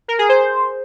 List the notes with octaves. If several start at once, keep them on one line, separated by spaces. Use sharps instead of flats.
A#4
G#4
C5